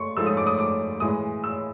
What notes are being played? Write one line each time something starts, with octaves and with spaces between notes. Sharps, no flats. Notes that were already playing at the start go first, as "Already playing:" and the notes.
Already playing: A3 C6 C#6
G#2 F3 A3 E6
D#6
D6
D#6
D6
A2 E3 G#3 D#6
E6